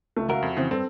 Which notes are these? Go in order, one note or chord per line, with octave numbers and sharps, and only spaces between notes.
C#2 A3
C#2 F#4 A#4 E5 F5
F2
C#3 E3 C4
G2 C4 A4